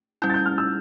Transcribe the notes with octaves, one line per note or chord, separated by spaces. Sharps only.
G3 C#4 E4 G6
A6
G6
F6
E6